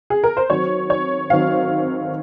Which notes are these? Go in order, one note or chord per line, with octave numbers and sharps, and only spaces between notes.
G#4
A#4
C5
D#3 F#3 C4 C#5
C#5
D#3 F#3 C4 F5